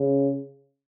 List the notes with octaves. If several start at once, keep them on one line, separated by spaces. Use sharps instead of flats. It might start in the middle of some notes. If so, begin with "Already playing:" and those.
Already playing: C#3